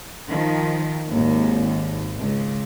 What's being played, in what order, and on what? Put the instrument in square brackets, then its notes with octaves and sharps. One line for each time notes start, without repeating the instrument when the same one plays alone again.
[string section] D#3 F3
G#1 D#2
C#2